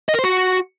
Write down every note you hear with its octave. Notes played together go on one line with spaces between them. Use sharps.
D#5
A#4
C5
F#4